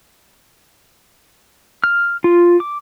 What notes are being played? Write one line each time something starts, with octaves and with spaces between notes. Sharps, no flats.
F6
F4
D6